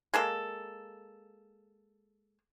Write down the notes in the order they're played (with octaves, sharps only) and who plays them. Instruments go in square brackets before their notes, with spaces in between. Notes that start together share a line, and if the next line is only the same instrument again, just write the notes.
[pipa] G#3 A#3 A4